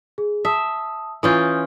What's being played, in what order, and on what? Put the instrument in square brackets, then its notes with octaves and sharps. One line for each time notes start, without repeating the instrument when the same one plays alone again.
[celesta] G#4
[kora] E5 [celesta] A5 D#6
[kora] E3 C#4 F4 [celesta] D#6 G6